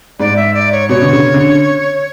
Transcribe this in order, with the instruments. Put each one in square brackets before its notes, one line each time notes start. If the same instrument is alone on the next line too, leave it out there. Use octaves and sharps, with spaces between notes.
[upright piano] G#2 [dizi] D5
[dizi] E5
D5
C#5
[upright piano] B2 [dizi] C#5
[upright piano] D3
C#3
D3